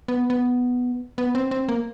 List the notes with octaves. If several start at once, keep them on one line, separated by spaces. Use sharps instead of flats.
B3
B3
B3
C4
C4
A#3